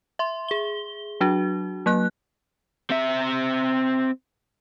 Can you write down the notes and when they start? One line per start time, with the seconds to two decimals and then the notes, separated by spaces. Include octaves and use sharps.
0.19 E5 C6
0.48 G#4 G7
1.21 F#3 D4 F#4
1.86 F#3 A#3 F#6
2.91 C4 E5